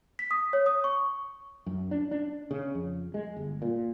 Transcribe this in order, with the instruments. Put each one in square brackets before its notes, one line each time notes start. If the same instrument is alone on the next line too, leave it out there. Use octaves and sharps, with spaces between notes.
[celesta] B6
D#6
C#5
D#6
C#6
[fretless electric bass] F#2
D4
D4
C#3
F2
G#3
G1
A#2